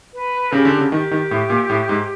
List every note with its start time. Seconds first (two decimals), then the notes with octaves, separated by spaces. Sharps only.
0.14 B4
0.52 C#3 G4
0.65 D3
0.78 C#3
0.92 D#3 G4
1.11 D#3
1.31 A2
1.50 A#2
1.70 A2
1.89 G#2